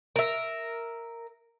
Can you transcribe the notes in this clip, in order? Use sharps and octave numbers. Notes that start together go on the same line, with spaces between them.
A#4 E5